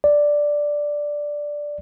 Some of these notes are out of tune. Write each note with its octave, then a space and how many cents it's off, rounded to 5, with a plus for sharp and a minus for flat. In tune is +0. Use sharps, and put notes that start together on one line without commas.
D5 +0